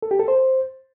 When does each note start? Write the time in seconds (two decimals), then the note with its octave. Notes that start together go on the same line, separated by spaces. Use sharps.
0.02 A4
0.11 G4
0.20 A4
0.28 C5